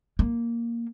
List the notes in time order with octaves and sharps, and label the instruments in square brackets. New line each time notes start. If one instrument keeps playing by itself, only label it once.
[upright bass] A#3